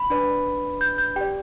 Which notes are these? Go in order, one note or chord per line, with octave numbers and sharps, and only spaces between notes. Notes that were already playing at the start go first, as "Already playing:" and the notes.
Already playing: B5
D4 B4 D5
G6
G6
G4 D5 G5